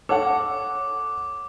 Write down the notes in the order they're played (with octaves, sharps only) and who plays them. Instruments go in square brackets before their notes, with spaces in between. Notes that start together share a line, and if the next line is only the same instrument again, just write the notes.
[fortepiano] A4 C#5 F#5 [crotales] D6